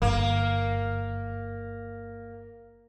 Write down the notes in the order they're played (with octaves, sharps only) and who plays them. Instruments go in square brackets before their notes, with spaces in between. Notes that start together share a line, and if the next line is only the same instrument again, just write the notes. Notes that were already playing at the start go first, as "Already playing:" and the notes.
[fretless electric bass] G1 [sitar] A#3